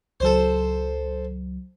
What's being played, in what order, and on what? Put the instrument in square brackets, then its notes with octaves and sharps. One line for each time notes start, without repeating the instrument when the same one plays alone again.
[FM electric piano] C#2 F#3 [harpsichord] A4 C5